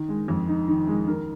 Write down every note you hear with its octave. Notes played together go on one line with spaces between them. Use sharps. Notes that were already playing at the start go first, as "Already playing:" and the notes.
Already playing: D#3
G#3
F2
D#4
D#3
G#3
D#3 A#4